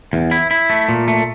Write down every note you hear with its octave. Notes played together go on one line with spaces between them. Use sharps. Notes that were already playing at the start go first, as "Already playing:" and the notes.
E2
E4
E4
A3
A#2
A3